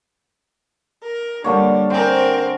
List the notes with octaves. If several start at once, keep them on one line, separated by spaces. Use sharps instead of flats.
A#4
D3 G3 A#3 D4 C#5
C4 A#4 C5 G5 G#5